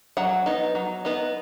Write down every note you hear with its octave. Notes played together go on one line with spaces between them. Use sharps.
F#3 F#5
B3 D#4
F#3
B3 D#4